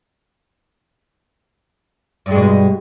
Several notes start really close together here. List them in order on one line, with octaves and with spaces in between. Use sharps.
G2 G#3 B2